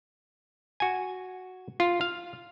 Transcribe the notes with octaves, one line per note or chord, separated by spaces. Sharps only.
F#4 G#5
F4
F5